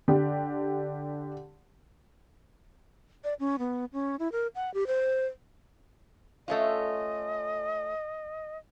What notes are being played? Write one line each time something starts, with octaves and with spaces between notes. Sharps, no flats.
D3 G4
D5
C#4
B3
C#4
E4
A#4
F#5
G4
C5
A3 C#4 F4 D#5